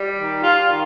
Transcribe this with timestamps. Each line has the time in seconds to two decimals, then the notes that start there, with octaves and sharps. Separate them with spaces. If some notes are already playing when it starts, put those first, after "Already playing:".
Already playing: G3
0.17 D#3
0.43 F4
0.68 D#3